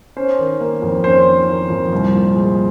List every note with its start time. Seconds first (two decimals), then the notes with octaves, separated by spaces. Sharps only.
0.17 C#4 C5
0.39 D#3
0.60 A#3
0.82 F2
1.04 C#4 C5
1.26 D#3
1.49 A#3
1.70 F2
1.93 C2
2.13 A#2
2.36 G#3